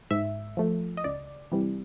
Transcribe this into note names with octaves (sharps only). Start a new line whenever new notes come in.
G#2 E5
F3 A3
D#5
C#2 D5
C3 E3 G3